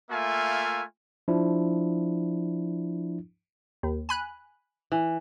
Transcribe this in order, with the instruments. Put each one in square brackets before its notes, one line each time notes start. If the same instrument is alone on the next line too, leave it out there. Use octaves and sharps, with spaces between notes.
[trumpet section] A3 A#3 F4 E5 G#5
[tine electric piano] F3 D4 E4
[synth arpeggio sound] D#2
G#5 B5 F#6
[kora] E3